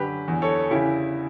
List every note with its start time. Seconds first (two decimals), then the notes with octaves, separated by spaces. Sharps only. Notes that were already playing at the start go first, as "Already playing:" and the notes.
Already playing: F#2 D3 G4 B4
0.28 E2
0.42 A4 C#5
0.71 C#3 E4 G4